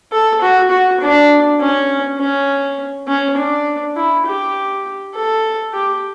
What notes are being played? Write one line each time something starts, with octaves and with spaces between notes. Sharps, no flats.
A4
F#4
F#4
D4
C#4
C#4
C#4
D4
E4
G4
A4
G4